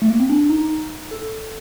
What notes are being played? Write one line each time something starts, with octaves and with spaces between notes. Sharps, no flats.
A3
A#3
C4
D4
D#4
A4